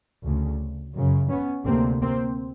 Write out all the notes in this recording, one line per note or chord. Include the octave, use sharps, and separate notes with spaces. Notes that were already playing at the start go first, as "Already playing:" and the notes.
D2 C#3
F#2 C#3
B3 C#4
D2 C3 A#3 C4
A#3 C4